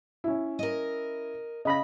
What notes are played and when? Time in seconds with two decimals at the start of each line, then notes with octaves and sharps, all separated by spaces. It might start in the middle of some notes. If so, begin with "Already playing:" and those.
0.24 C#4 E4
0.59 A#4 D#5
1.65 C#3 D#5 B5 A#6